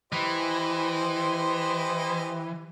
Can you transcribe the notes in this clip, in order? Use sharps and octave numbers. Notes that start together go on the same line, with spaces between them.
E3 G4 C5 D#5